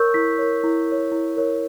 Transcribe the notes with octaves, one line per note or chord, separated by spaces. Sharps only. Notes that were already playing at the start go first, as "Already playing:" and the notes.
Already playing: A#4 C#5 C#6 E6 G6
E4 B6
A#4 C#5
E4
A#4 C#5
E4
A#4 C#5